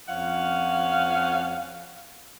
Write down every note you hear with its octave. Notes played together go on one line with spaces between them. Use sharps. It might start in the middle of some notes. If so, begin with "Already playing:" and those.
F2 F3 C#4 F5 F#5